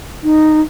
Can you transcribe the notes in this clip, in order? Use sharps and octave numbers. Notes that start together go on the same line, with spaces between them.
D#4